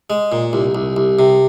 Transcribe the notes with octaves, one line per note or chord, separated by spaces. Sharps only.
G#3
A#2
C2
C2
C2
C3